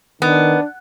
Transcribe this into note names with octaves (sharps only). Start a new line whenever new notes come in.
D#3 B3 D4